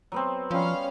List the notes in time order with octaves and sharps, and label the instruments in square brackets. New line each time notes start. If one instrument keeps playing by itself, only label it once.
[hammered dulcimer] F#3 B3 C4
[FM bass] F3 [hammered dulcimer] G3 C#5 [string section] C#4 F5